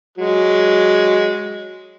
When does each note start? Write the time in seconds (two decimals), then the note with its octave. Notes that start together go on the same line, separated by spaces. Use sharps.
0.18 F#3 G#3